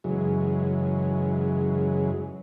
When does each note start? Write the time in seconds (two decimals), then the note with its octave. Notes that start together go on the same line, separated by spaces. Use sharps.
0.04 F#2 C#3 E3 F#3 G#3